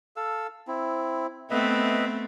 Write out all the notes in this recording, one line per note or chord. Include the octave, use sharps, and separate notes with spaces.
A4 F5 E6
C4 E4
A3 B3 C4 B4 D#5 E5